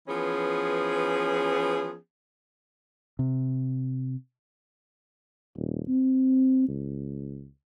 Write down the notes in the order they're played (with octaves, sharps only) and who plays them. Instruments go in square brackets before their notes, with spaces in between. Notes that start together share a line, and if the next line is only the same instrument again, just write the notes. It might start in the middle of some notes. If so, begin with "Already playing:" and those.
[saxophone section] E3 F3 B3 C#4 G#4
[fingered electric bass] C3
[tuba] D#1
C4
C#2